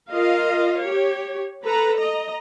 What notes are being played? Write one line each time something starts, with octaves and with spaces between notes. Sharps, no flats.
F4 A#4 D#5 F5
G4 C#5
A4 B4 A#5
D#5 A#5